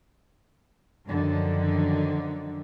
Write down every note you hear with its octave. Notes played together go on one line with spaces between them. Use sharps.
F#2 D3 D#3 F3